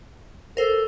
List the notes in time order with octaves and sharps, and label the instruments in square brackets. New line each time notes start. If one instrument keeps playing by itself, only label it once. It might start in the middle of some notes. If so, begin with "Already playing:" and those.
[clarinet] A4 [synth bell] A#4 C5